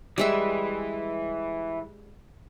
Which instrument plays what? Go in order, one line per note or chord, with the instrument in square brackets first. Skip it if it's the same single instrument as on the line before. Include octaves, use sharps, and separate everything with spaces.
[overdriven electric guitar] E3 [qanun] G3 G#3 E5